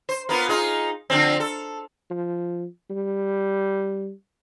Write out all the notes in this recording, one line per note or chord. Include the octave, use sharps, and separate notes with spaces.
C5
A#3 B3 F4
D#4 F4 G#4
D3 F3 C4
A4
F3
G3